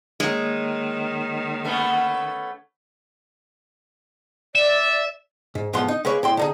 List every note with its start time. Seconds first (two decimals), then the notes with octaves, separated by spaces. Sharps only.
0.20 D#3 G#3 A#3 C#5
1.64 A3 B3 C#4
4.55 D5 E5
5.55 G#2
5.73 B1 G#2 F3 B3 C6
5.88 D#4
6.05 G#3 A#3 B4 C#5
6.23 A2 G5 C6
6.37 D3 D#4 G#4